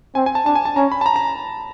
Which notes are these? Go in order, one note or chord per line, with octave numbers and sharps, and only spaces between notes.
C4 G#5
G#5
A5
D4 A5
G#5
A5
C#4 A#5
B5
A5
A#5
A#5